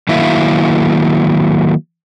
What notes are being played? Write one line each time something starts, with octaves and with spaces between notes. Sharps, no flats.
D#3 F#3 A#3 E4 E5 F5